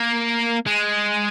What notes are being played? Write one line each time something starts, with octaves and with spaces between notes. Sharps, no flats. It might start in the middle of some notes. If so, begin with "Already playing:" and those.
Already playing: A#3
G#3